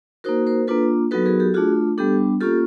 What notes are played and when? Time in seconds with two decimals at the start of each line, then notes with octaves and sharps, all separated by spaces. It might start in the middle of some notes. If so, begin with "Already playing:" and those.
0.24 A#3 D#4 F#4 A#4 C5
0.47 A#4 C5
0.67 A#3 D4 F4 A4 B4
1.11 F#3 B3 D#4 F#4 A4 B4
1.26 G#4 A#4
1.40 G4 A4
1.54 A3 D4 F4 F#4 G#4
1.98 G3 B3 D4 G4 A4
2.41 A#3 C#4 F4 G4 A4